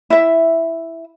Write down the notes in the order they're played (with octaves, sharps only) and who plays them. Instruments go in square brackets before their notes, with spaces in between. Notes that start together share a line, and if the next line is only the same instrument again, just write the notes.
[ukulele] E4 E5